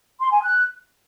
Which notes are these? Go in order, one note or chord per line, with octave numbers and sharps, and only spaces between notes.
C6
G#5
F#6